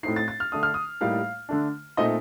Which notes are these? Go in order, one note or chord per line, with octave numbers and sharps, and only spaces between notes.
A2 A3 C4 D#4 C7
A6
A6
F6
D3 A3 D4 D#6
F6
D#6
A2 G3 A#3 D#4 F5
D3 A3 D4
A#2 A3 C4 D#4 D#5